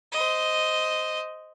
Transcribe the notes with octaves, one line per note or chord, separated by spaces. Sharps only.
C5 D#5